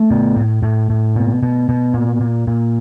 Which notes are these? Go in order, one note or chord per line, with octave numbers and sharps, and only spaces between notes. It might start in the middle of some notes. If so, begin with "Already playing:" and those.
Already playing: A3
B2
A2
A2
A2
B2
B2
B2
A#2
A#2
A#2